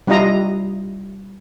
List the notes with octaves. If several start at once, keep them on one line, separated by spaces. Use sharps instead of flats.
G3 D4 E4 F4 D#5 A#5